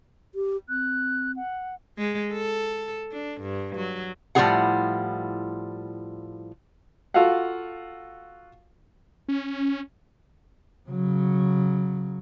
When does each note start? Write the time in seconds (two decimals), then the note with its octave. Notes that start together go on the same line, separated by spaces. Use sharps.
0.35 G4
0.69 C4 F#6
1.36 F#5
1.98 G#3
2.32 A4
3.12 D4
3.41 G2
3.76 F#3
4.35 A2 F3 G3 E4 G#4 F#5
7.14 F4 F#4 A4 F5 F#5
9.28 C#4
10.90 C#3 F#3